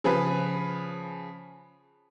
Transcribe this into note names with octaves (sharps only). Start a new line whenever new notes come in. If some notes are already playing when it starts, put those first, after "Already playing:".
C#3 F3 G#4 B4